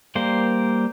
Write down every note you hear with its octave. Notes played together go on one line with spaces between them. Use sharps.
G3 A#3 C5